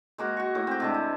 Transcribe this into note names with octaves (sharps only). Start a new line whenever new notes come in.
G#3 A#3 F#4
F#4 C#6
A2
C4 G4
C3 G#3 D4
E4